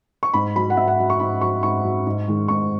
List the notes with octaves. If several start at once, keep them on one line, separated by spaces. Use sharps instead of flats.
C#6
G#2 B5
F#3 B5
F#5
G#2 E5
F#5
F#3
C#6
G#2 B5
F#3 C#6
G#2 C#6
F#3
G#2
D#3 G#3
G#2 C#6